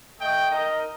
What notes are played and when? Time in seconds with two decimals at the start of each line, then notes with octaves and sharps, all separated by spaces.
0.20 A3 D#5 G5
0.50 D#4 A#4 D#5